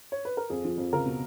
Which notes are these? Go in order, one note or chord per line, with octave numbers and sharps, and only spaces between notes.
C#5
B4
A#4
F2 G#4
F3
F2
C#2 A#4
B2